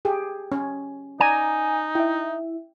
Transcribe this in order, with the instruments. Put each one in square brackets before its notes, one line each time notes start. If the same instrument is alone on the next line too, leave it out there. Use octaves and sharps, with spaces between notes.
[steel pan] G4 G#4
C#4
[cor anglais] D#4 [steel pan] D5 A#5 [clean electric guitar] G#5
[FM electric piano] E4 E5 [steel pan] G5